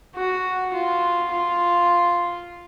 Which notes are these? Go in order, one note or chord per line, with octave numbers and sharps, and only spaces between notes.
F#4
F4
F4